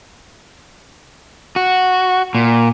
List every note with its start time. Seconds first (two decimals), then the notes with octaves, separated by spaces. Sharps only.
1.56 F#4
2.34 A#2